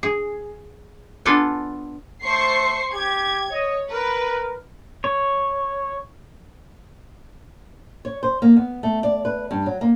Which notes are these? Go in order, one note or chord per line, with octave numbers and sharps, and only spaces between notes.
G#4
B3 D4 F4 A4 G#5
A3 C5 C#6 C7
G4 G#6
C#5 D#5
A#4 B4
C#5
C#5
C5
A#3
B3
A3
D5
B4
G2
F#3
A#3